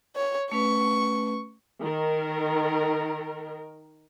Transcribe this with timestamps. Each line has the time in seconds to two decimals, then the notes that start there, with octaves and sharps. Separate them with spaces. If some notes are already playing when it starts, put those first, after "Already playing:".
0.16 C#5
0.52 A3 C#4 B4 C#6
1.81 D#3 A#4